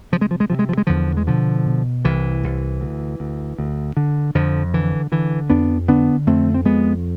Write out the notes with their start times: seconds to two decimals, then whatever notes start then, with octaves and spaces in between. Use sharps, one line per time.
0.12 C3 F3
0.21 G#3
0.31 F3
0.40 G#3
0.50 C3 F3
0.59 G#3
0.69 F3
0.78 G#3
0.87 E2 D3 F3
1.17 G#3
1.27 B2 D3 F3
1.66 B2
2.05 C2 E3
2.44 C2
2.81 D2
3.20 D2
3.58 D2
3.97 D3
4.35 F2 D3 F3
4.74 D3 E3
5.12 D3 E3
5.50 F2 B3 D4
5.88 D3 B3 D4
6.27 F2 A3 C4
6.54 C4
6.65 F2 G#3 B3